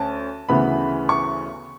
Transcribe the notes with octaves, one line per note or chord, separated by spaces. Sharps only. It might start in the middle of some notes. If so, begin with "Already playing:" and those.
Already playing: D2 C#4 A5
D2 C#3 E3 B3 B5
C#6